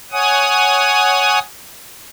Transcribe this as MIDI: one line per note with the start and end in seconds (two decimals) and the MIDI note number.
0.12 1.39 73
0.12 1.39 78
0.12 1.39 80
0.12 1.39 87